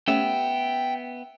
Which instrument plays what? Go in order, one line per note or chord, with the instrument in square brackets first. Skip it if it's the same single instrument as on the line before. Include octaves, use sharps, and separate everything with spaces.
[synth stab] A3 C#4 G4 [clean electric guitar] B3 E5 [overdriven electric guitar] G5